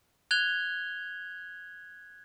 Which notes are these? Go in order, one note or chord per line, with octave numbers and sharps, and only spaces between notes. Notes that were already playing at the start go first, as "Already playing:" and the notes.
F#6 G#6 F7 G7